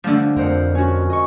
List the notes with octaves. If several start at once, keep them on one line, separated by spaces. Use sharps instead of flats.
D3 F3 G3 A3
F2 A#4 C5 F#5
C#4 F#4
D#5 C#6